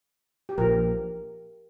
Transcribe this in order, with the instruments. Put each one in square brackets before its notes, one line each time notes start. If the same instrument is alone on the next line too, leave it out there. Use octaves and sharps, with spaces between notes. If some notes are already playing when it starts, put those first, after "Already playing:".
[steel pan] G4
[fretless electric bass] A#1 A#2 F3 [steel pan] A#4